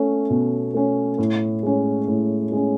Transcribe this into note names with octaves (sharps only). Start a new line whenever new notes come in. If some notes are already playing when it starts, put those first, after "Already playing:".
Already playing: A3 C#4
B2
A3 C#4
A2
G#3 C#4
A2
G#3 C#4